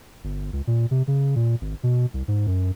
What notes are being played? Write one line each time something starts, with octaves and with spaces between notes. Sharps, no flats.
G1
C#2
A#2
C3
C#3
A#2
G#1
B2
C2
G#2
F#2